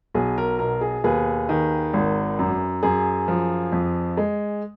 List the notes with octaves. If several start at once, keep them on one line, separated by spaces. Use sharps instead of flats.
B1 G#4
A#4
B2 A#4
G#4
D#2 G#4 B4
D#3
G#1
F#2
F#2 G#4
F3
F2
G#3